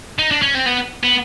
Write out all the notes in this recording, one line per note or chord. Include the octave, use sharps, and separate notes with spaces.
D#4
D4
C#4
C4
B3
B3